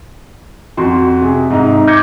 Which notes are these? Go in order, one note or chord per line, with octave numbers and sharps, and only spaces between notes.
F2 F#4 C6
C3 G#4
G#2 C3 D#4
D6 G6 G#6 A#6 C#7